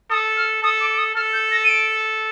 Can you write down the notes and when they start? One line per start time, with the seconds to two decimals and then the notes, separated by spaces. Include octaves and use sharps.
0.10 A4 D#6
0.37 F6
0.62 A4 D#6
0.81 D6
0.91 D6
0.98 D#6
1.15 A4 F6
1.33 G6
1.51 A#6
1.64 D#7
1.69 D7